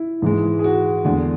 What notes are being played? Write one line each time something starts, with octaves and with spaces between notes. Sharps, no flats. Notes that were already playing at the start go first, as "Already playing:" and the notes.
Already playing: E4
G#2 E3 G#3
G#4
F#4
E2 D3 G#3 G#4